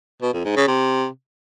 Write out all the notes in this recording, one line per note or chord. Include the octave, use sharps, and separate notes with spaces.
B2
F2
G#2
C#3
C3